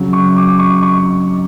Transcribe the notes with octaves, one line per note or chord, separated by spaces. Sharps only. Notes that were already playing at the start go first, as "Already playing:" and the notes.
Already playing: C#3 F#3
C#6
D6
C#6
C#6